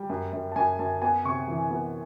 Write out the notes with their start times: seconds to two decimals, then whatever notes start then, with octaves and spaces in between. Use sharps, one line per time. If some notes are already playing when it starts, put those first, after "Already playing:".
Already playing: G3 G5
0.09 F#2
0.33 F#2
0.52 A5
0.56 F#2 G#5
0.79 F#2 A5
1.02 B3 G#5
1.25 C3 C#6
1.48 E3
1.70 B3